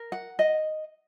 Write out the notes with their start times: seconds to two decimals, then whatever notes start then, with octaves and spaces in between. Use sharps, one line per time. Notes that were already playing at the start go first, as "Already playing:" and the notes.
Already playing: A#4
0.12 F#5
0.39 D#5